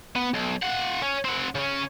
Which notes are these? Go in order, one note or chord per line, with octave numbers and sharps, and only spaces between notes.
B3
B1
F4 F#5
C#4
C4 F#5
C#3 C#4